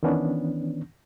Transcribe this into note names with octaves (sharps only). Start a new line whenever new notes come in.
D#3 E3 B3 C#4 D4